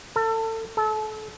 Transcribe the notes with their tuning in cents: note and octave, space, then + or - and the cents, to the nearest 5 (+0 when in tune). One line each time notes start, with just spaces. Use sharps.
A4 +30
A4 -30